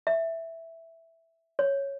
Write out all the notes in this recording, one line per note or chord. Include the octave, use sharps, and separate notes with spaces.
E5
C#5